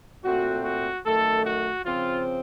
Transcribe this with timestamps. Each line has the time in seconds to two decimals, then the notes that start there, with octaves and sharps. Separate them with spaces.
0.23 A#2 A3 C4 F#4
0.63 F#4
1.04 F#2 D#3 A3 A4
1.45 F#4
1.84 C#3 F3 C4 F4